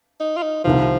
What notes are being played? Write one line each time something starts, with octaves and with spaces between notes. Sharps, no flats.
D#4
F4
D#4
C2 C3 D#3 F3